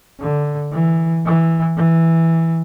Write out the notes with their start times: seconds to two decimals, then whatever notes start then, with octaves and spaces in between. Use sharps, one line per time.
0.20 D3
0.73 E3
1.25 E3
1.77 E3